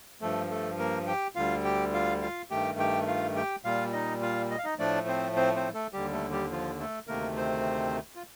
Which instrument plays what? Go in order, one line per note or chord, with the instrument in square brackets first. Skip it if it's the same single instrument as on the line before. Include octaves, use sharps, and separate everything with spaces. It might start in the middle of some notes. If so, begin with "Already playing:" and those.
[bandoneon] G2 F3 A3 A4
A3 A4
A#3 A#4
G4 G5
D2 D3 G3 F4 F5
G4 G5
F4 F5
F4 F5
G2 D#3 A3 G4 G5
G4 G5
F4 F5
G4 G5
A#2 G3 F4 F5
D#4 D#5
F4 F5
D#5
F5
D#4 D#5
A2 F3 A3 D4 D5
C4 C5
C4 C5
C4 C5
A3 A4
D#2 D3 G3 G4
A3 A4
G3 G4
F3 F4
A3 A4
D2 C3 D#3 A3 A#3 A#4
C4 C5
F4